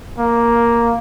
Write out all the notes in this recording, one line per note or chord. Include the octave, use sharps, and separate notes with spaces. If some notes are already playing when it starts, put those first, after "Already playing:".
A#3